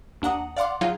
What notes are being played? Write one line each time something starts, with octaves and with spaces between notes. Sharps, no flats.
D#2 D4 F#5 A#5 D#6
D5 F5 F#5 C6 D6
F#3 D#4 F4 G#4 F5